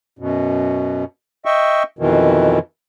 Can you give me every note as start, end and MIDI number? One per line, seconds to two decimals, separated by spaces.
0.19 1.04 42
0.19 1.04 47
1.45 1.83 75
1.45 1.83 76
1.45 1.83 79
1.45 1.83 85
1.99 2.59 41
1.99 2.59 47
1.99 2.59 51
1.99 2.59 52